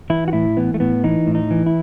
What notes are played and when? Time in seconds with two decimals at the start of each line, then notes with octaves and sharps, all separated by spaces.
0.10 E3 E4
0.28 F#4
0.33 A2 E4
0.57 E3 B3
0.74 A3
0.80 A2 B3
1.04 E3 D#4
1.27 A2
1.35 D#4
1.51 E3
1.66 E4